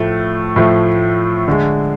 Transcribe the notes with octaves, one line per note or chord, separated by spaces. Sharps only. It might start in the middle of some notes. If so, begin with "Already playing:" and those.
Already playing: A2 F3 A3
A2 F3 A3
D3 G#3